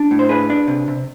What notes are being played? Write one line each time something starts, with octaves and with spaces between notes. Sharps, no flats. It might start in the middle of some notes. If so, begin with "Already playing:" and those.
Already playing: D4
A2
C5
D4 G#4 B4
D4
C3
C3